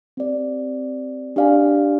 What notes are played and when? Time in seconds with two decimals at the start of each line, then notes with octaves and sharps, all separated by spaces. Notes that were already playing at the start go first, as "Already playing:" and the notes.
0.17 C4 G4 D5
1.36 D4 G4 D5 F5 G#5